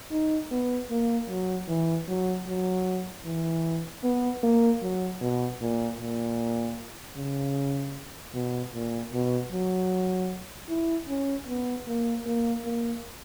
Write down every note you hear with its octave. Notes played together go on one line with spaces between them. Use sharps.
D#4
B3
A#3
F#3
E3
F#3
F#3
E3
B3
A#3
F#3
B2
A#2
A#2
C#3
B2
A#2
B2
F#3
E4
C#4
B3
A#3
A#3
A#3